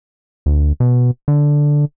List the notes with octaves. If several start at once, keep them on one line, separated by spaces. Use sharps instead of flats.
D2
B2
D3